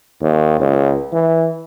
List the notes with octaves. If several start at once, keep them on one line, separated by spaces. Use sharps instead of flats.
D#2
C#2
E3